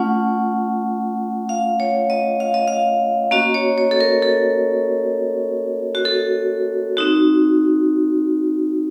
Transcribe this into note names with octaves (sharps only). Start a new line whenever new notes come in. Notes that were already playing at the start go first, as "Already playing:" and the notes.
Already playing: A3 C#4 F4 F#5
F5
C#5
D#5
F5
D#5
F5
A#3 C#4 F#4 D#5
C#5
C#5
A4
A#4
A4
F#4
A4
C4 D#4 F#4